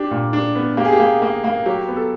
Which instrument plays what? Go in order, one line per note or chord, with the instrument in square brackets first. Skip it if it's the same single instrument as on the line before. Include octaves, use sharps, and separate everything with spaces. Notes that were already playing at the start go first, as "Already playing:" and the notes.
Already playing: [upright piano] D4 G4
A#2
D4
B3
A#3 G4
G#4
G4
A#3
A#3
A#3
F#3 G4
B3
A4